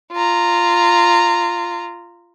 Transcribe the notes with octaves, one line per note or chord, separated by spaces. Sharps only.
F4 A#5